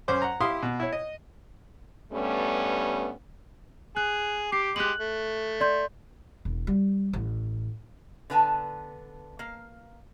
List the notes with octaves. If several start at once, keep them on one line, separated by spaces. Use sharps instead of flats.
F#2 C#4 C5 D6
F#5 A#5
E4 G4 F5 C6 D#6
B2
E4 C#5
D#5
G2 G3 A3 B3 C#4
G#4 F#6
G4 D6 C7
G#3 G4 F#6 F#7
A3
D5 C6 G6
E1
G3
A1
D3 B3 B4 G#5 A5
A#3 F5